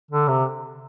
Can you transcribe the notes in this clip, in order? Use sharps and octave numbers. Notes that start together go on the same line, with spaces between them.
D3
C3